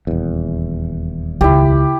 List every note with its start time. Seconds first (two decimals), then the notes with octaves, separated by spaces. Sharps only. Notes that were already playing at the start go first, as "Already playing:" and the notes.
0.07 D#1 E2
1.41 C#2 E4 G4